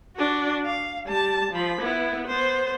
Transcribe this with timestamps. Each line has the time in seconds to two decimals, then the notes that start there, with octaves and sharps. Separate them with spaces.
0.17 D4 F#4
0.66 F5
1.07 G3 A5
1.52 F3 B5
1.82 B3 E4
2.27 B3 C5